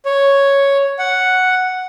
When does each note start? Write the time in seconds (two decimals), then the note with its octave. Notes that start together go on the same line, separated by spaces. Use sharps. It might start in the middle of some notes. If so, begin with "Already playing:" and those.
0.05 C#5
0.99 F#5